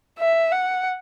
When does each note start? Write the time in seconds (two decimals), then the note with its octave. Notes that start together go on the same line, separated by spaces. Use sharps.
0.19 E5
0.52 F#5